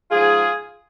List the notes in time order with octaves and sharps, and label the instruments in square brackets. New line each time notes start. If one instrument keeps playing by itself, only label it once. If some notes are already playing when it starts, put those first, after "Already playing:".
[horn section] G#2 F3 F4 G#4